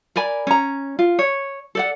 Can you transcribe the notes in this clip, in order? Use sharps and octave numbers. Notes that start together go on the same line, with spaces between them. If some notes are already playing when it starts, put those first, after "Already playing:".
A#4 D5 G#5 B5
C#4 A#5
F4
C#5
A4 D5 F#5